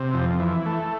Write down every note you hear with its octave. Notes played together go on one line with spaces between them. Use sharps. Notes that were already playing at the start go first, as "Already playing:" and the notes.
Already playing: C3
F2
E3
A3